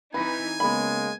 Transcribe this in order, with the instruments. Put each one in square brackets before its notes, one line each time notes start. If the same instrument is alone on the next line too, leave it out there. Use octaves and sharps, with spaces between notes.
[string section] E3 C4 D#4 [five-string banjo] B4 [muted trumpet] G#5
[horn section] C#3 G#3 A#3 [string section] B3 [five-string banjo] B5